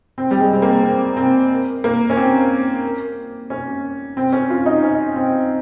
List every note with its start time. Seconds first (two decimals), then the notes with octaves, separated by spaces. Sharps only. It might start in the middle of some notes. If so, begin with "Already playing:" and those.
0.18 C4
0.31 G3
0.40 G#3
0.53 C4
0.62 A#3
0.83 C4
1.17 C4
1.84 A#3
2.10 C#4
2.16 C4
3.50 C#4
4.17 C4
4.33 C#4
4.50 F4
4.66 D#4
4.83 C#4
5.16 C4